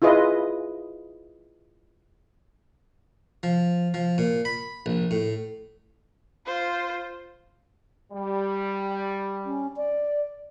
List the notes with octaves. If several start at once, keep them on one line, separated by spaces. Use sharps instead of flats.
E4 F4 G#4 B4 D#5
F3
F3
A#2
B5
A#1
A2
F4 C5
G3
C#4
D5